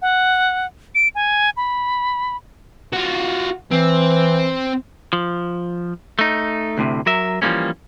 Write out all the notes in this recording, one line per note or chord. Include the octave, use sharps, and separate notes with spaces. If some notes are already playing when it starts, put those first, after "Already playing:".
F#5
D7
G#5
B5
F4 F#4
E3 C4
F3
A3 D#4
D2 A2 C3
F#3 A#4 E5
E3 F3 G3 G#3 A#3 C#4